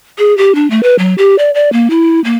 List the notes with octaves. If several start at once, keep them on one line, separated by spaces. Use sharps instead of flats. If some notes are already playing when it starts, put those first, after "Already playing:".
G#4
G4
D4
A3
B4
F#3
G4
D5
D5
A#3
E4
A#3